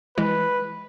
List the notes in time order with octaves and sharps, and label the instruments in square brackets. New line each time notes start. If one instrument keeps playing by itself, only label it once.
[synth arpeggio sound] E3 G#3 E4 [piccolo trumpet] B4